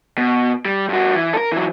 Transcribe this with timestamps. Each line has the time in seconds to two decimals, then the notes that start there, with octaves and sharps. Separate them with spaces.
0.18 B2
0.65 G3
0.89 G2 F#4
1.15 E3
1.33 A4 A#4
1.52 E3 F#3